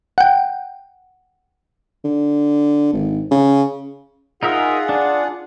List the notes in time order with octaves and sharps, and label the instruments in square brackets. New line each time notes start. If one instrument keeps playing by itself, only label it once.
[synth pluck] F#5 G5
[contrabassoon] D3
G#1
C#3
[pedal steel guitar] D#4 A#4 E5 [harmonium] F4 G#4 F#5
[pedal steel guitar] D4